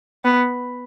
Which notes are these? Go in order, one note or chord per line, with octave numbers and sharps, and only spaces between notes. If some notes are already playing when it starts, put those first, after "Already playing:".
B3